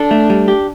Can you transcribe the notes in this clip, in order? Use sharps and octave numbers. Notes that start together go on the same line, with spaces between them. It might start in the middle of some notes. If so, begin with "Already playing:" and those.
Already playing: D4 A4
A3
G3
G4